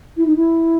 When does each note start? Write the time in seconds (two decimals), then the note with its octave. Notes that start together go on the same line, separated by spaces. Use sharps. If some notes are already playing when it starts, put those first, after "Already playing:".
0.17 E4
0.26 D#4
0.36 E4